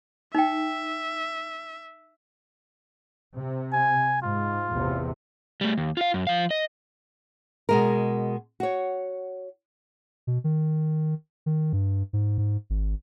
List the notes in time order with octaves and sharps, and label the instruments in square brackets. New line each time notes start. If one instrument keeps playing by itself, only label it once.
[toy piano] D#4 G5 [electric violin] E5
[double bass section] C3
[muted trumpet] G#5
[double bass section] G#2 [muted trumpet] F4
[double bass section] A1 E2 C3
[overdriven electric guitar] G3 A3
D#2
F4 F5
F#2
F3 F5
D#5
[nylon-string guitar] B2 G#3 A#4
F#4 C#5
[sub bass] B2
D#3
D#3
G2
G#2
G#2
G#1